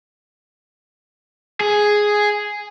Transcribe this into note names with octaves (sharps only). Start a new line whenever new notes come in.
G#4